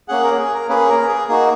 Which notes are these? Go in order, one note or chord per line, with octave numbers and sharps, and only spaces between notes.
A#3 C#4 G#4 F#5
A#4
G#4
A#4
A#3 C#4 G#4 B4
A#4
G#4
A#3 D#4 F#4 G#4